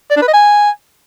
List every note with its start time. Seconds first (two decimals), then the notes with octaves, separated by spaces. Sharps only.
0.11 D5
0.16 D4
0.22 B4
0.28 D#5
0.33 G#5